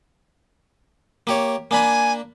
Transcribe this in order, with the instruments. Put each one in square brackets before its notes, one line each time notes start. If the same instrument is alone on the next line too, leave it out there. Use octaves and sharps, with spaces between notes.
[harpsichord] A#3 G4 C#5
[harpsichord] A#3 D4 B5 [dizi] G#5